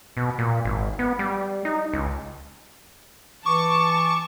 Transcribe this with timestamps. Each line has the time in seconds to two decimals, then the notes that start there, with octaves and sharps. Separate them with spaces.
0.17 B2
0.38 A#2
0.65 G#1
0.99 B3
1.19 G3
1.65 D#4
1.93 C#2
3.46 E3 A5 C#6 D6